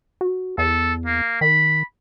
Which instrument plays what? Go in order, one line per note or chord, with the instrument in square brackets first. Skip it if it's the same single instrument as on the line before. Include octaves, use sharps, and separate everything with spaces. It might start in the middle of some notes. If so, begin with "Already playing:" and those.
[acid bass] F#4
[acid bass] E2 [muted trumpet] A4
[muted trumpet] A#3
[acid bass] D#3 [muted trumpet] B5